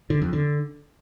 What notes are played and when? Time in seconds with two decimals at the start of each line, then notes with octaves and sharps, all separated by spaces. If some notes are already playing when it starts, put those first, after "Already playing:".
0.10 D3
0.22 F2
0.33 D3